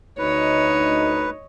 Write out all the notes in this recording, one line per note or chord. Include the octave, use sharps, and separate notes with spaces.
D2 D#4 B4 C#5 D#5